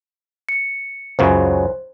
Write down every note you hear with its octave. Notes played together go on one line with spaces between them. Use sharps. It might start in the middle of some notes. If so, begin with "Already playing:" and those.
C#7
C#2 F#2 C#3 C5